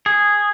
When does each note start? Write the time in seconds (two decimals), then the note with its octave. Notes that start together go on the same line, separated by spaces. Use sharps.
0.06 G#4